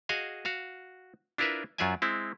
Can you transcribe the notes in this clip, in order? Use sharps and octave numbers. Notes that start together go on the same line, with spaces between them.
F#4 G#4 D#5 F5 G#5
F#4 F5
D4 E4 F4 A#4 B4 E5
F#2 F#3 F4 D5 E5 G#5
G#3 C4 E4